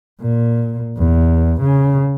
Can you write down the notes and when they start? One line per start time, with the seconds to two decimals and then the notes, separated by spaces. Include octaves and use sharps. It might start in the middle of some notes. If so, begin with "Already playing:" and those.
0.21 A#2
0.98 E2
1.61 C#3